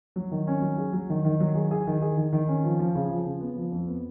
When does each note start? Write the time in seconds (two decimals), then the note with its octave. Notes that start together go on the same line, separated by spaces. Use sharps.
0.16 F#3
0.31 D#3
0.47 C#4
0.62 F#3
0.78 G#4
0.93 F#3
1.10 D#3
1.25 D#3
1.40 F#3
1.55 G#4
1.71 G#4
1.87 D#3
2.02 G#4
2.17 D#3
2.33 D#3
2.48 C#4
2.64 F3
2.79 F3
2.95 C#3
3.11 F3
3.26 C#3
3.41 B3
3.57 F3
3.72 F2
3.88 B3